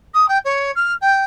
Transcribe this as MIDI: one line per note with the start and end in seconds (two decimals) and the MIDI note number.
0.14 0.28 87
0.28 0.38 79
0.45 0.71 73
0.75 0.94 89
1.01 1.24 79